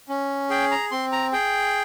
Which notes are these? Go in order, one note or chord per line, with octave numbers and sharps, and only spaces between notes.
C#4
G#4 G5
A#5
C4 C6
A#5
G#4 G5